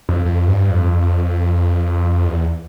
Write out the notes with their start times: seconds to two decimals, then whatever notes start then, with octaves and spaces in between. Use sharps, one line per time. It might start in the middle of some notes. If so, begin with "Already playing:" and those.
0.09 F2
0.25 F2
0.48 G2
0.71 F2
2.27 E2